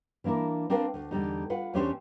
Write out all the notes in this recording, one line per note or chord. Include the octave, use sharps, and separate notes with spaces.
E3 A#3 D4 E4 A#4
C4 D4 A#4 B4 F5
D2
E2 D3 G3 D#4
F4 B4 F#5
E2 A3 C#4 D4 G4 C5